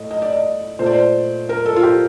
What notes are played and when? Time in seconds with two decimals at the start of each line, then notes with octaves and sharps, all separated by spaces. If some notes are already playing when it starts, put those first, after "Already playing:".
Already playing: A2 A3 D#5
0.11 D#5
0.22 D5
0.33 D#5
0.79 A#2 A3 C5
0.86 D5
0.93 C5
1.49 A#4
1.66 A4
1.76 F4
1.83 G4